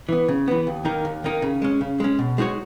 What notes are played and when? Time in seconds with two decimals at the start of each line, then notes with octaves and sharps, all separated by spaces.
0.09 E3 B3
0.28 C#3
0.48 E3 B3
0.67 D#2
0.85 D#3 A#3 D#4 A#4
1.05 D#2
1.24 D#3 A#3 D#4 A#4
1.42 C#3
1.62 G#3 C#4
1.81 C#3
2.00 G#3 C#4
2.19 B2
2.38 G#3 D#4 F#4 C#5